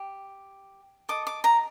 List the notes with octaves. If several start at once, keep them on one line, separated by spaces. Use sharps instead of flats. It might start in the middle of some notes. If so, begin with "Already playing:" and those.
Already playing: G4
A4 D#5 D6
D6
A#5